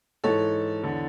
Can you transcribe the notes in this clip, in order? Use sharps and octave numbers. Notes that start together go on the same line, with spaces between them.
G#2 E3 A4 C#5
E2 D3